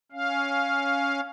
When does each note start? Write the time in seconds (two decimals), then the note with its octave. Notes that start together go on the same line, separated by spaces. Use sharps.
0.12 C#4 F5